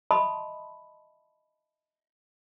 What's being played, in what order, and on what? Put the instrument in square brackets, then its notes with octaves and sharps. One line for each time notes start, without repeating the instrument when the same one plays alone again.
[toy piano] D#5 E5 A5 B5 C6 D#6